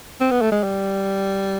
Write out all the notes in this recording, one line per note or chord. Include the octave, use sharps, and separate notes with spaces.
C4
B3
A3
G#3
G3